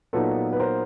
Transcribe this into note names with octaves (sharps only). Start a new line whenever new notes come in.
A#2 F#3 B3 D#4 A4 B4
B4
A#4 C5